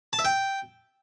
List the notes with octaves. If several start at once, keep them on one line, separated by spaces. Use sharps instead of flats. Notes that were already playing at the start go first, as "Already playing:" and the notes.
A5
E5
G5